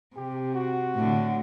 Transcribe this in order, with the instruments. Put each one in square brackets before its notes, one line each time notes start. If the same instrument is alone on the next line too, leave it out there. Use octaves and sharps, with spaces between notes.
[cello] C3 [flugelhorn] G4
[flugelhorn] F#4
[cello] A2 D3